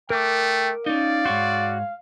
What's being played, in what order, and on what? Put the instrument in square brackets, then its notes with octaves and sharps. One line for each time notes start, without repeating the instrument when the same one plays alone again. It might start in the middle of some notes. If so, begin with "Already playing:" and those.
[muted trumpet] A3 [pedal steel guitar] A#4 D6 [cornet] G5
[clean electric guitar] C#4 D#4 [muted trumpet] D5 [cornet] F5
[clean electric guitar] G#2 C#5 C6 [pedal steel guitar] F#4